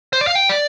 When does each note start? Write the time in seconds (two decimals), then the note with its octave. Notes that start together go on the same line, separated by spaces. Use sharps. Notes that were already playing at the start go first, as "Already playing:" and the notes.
0.13 C5
0.21 D5
0.27 F5
0.35 G5
0.49 D5